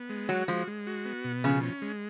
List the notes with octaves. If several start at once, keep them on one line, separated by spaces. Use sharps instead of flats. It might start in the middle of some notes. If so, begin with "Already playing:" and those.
Already playing: B3
G#3
F#3 F#4
F3 G#3
G#3
F#4
B3
B2
C#3 F3
C#4
G#3